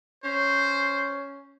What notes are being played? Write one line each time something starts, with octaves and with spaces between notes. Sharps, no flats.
C#4 C5